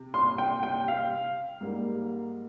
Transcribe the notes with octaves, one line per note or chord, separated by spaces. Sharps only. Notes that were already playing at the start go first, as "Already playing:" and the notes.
Already playing: C3
C6
G5
G5
F5
G#2 G3 A#3